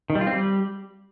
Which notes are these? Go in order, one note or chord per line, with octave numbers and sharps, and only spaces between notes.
D#3
G3
F4
C4
G3